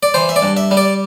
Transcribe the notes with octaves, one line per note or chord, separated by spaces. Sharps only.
D5
E3 C5
E5
D5
G2
E5
G3
D5